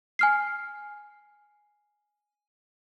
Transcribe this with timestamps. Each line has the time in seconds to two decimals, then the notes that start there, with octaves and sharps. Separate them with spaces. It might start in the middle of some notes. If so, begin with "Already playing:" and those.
0.19 G#5 F6 C7